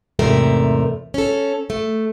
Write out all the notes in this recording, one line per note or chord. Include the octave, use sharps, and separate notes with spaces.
E2 G#2 C3 A3 A#4
C#4 A4
A3